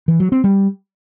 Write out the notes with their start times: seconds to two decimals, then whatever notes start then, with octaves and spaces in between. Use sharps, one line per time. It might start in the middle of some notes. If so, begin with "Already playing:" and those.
0.08 E3
0.20 F#3
0.32 C4
0.44 G3